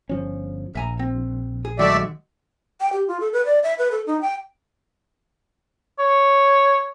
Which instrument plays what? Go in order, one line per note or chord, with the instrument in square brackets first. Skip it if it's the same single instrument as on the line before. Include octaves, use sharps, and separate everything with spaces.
[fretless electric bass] G1 F3 C#4
[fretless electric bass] A#1 [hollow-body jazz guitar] E5 G#5 A#5
[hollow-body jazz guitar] C4
G#4
[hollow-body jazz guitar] D#3 F#3 G#3 [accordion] A3 D5 E5
[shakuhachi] G5
G4
F4
A4
B4
D5
E5
B4
A4
D#4
G5
[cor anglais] C#5